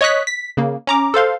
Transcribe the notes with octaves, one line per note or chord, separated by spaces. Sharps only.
C#5 D#5 C#6 D#6 F#6 B6
B6
C#3 A#3
C#4 A#5 D6
A4 C5 F5 C6